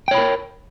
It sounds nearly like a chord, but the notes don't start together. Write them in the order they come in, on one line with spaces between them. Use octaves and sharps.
G5 C#5 B5 A#4